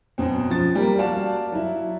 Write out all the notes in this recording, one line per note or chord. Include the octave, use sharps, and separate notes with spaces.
F#2 B2 C4
F3 A6
G3 A#3 A#4
F#4 D5 F5 A5
F#3 E4